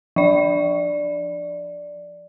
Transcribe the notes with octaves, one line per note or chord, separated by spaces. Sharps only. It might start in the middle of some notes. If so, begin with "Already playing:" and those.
F3 D5